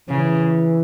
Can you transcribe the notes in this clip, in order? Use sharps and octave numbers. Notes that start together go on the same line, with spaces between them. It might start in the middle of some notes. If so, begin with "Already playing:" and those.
C#3 E3